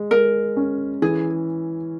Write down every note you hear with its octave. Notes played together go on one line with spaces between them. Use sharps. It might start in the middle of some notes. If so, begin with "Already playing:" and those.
Already playing: G#3
G#3 A#4
C#4
E3 G#4